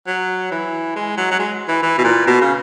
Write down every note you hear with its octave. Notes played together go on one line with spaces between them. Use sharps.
F#3
E3
G#3
F#3
F#3
G#3
E3
E3
B2
A#2
B2
C#3